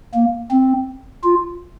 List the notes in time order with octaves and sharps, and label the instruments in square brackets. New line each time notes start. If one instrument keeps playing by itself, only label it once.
[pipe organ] A#3
C4
F4